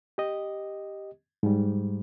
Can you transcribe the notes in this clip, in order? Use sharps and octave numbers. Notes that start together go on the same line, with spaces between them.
G4 D#5
G#2 G3